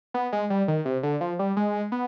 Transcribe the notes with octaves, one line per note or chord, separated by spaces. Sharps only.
B3
G#3
G3
D#3
C3
D3
F3
G3
G#3
B3